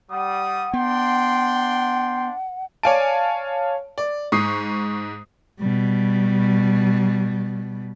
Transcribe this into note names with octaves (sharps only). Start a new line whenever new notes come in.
G3 F#5 D#6
B3 D4 G5 C6
C#5 D5 F5 G#5 A5 D7
D5
G#2 C#6 D#6 C7
B2 G3